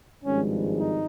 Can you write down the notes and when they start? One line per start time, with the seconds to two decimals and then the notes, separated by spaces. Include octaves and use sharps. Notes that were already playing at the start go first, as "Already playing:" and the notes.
0.24 G#1 G2 F3 G#3 C#4
0.77 D#4